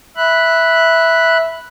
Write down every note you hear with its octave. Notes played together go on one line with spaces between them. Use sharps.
E5 B5 F#6